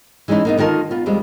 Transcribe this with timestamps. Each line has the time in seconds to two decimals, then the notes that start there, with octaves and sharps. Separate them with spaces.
0.28 E3 G#3 C#4 D#4 E4
0.45 A#3 B3 D#4
0.58 D3 D#3 F4 A#4 A5
0.91 B3 F4
1.06 F2 G3 G#3 C4